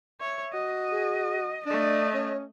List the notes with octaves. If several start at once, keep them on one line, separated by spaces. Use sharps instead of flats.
C#5 E5
F#4 D#5
G#4
A3 D4 D5 D#5
C#4 C#5